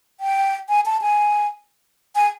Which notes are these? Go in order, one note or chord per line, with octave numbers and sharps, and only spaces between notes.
G5
G#5
A5
G#5
G#5